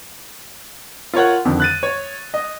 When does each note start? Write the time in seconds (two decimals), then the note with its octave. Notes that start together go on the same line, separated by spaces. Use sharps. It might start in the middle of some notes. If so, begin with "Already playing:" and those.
1.14 F4 A#4 C#5 F#5
1.45 F2 D3 D#3
1.60 F#6 A6 D#7
1.83 C#5
2.34 D#5